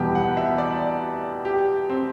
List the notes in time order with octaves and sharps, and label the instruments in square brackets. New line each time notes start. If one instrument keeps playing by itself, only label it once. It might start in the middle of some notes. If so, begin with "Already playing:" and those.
Already playing: [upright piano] E2 B2 G3 B3 [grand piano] G4
[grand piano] F#5
E5
D5
G4
C4